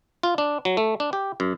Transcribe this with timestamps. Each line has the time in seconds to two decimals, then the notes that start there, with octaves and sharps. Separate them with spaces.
0.23 F4
0.38 D4
0.65 F#3
0.77 A3
1.00 D4
1.13 G4
1.40 F#2